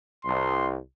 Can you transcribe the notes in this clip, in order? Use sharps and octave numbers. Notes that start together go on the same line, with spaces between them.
C2 C6